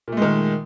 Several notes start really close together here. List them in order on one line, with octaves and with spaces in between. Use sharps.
A#2 A3 G#3 D#3